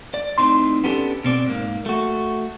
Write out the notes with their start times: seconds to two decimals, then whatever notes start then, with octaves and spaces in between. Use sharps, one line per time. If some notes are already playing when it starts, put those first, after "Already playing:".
0.14 D5
0.38 A2 C4 D#4 C6
0.84 B3 C#4 D4 G4 A4
1.24 B2 C4 D5
1.46 G#2 A#3
1.86 A3 F#4